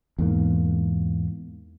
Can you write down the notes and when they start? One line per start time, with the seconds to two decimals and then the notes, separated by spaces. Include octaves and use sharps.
0.19 E2 G#2 A#3